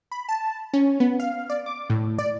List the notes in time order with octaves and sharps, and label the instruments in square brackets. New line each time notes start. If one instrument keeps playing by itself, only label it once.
[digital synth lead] B5
A5
C#4
B3
F5
D5
D6
A2
D5